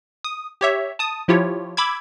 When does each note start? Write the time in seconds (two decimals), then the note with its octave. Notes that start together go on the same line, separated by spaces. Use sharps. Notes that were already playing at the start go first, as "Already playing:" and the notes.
0.24 D#6
0.61 G4 C#5 E5
0.99 A5 D#6
1.28 F3 E4 F4 G4 C#5
1.77 B5 D6 E6 G#6